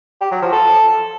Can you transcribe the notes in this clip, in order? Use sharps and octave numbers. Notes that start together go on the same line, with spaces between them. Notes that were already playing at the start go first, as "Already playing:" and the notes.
G4
F#3
F3
A4